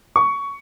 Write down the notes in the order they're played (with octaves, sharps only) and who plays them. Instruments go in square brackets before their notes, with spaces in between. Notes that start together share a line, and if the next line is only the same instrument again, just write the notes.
[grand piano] C#6